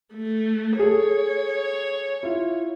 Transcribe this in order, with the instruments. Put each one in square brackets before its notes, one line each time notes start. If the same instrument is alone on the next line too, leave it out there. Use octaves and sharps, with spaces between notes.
[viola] A3
[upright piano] G#4 A4 [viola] C#5
[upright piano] E4 F4